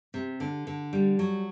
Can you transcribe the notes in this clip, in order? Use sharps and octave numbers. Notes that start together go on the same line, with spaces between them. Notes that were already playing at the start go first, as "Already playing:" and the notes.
C3
D3
D3
G3
F#3